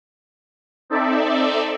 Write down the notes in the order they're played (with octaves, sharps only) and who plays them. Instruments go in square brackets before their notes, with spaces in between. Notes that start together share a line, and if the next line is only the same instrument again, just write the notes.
[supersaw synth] C4 D#4 A4 D5 E5